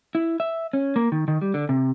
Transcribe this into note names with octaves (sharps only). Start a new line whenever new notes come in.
E4
E5
C#4
A#3
D#3
D#3
G3
D3
C3